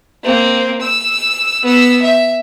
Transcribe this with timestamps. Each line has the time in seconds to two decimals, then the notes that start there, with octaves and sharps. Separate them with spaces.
0.24 A#3 C4
0.81 E6
1.63 B3 E6
2.02 E5